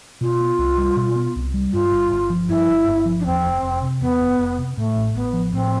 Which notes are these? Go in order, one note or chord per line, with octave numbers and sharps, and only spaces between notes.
B2 F4
B3
C2
G3
B2
B3
C2
G3
G2 F4
G1
G1
F3
G2 E4
G1
G1
F3
D4
E2 C4
F1
F1
C3
E2 B3
F1
F1
C3
A2 A3
A1
A1 B3
F3
A2 C4